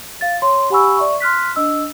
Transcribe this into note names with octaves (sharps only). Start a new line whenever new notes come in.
F5 A6
C#5 C6
G4 F#5 G#5 B5 C#6 E6
D5 E5 C#6
C6 F6 F#6 B6
D4 D#5 E6